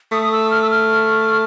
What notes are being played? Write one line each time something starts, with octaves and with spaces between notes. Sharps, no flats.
A3 D#6
D#6
E6
F6
E6
F6